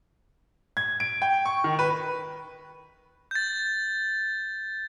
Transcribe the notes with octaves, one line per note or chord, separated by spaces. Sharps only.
G#6
D7
G5
C#6
D#3
B4
G6 A6